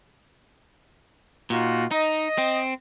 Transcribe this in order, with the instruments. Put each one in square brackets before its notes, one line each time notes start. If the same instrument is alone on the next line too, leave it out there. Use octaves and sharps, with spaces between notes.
[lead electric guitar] A#2 [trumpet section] D#4 F4 F#4
[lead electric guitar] D#4 [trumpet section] D#5
[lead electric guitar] C4